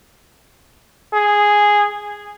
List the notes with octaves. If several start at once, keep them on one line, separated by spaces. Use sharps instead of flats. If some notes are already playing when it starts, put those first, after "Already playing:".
G#4